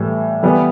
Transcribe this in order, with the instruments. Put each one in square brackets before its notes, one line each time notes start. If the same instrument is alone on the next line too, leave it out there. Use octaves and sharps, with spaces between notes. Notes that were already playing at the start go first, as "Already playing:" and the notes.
Already playing: [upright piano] A2 E3 G3
E3 G3 B3